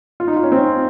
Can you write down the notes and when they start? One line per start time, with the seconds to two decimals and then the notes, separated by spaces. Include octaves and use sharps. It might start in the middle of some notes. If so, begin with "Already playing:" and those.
0.20 F4
0.28 D#4
0.36 F4
0.43 C#4
0.52 C4